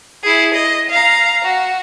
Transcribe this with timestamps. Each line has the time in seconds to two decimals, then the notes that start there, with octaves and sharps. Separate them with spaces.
0.23 E4 G#4
0.54 D#5
0.90 F5 A#5
1.45 F#4